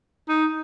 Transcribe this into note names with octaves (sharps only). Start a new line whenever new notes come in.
D#4